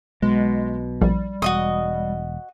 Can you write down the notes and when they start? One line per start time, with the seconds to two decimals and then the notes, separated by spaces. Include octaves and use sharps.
0.22 B1 B2 G#3
1.01 A#1 G3
1.42 E1 F#4 D#5 D#6